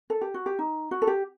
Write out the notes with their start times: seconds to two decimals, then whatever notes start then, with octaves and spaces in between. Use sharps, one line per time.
0.10 A4
0.21 G4
0.34 F#4
0.46 G4
0.59 D#4
0.91 F#4
1.02 A4
1.07 G4